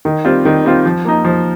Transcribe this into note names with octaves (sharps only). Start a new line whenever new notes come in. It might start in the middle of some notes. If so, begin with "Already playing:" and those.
D#3
G3 C4 F4
D#3
G3 C4 F4
F3
A#3 D#4
F3